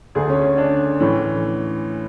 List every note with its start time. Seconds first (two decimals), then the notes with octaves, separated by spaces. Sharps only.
0.15 D2 D3 G#4
0.29 C#4
0.44 C#4
0.58 D4
1.00 A2 E3 C#4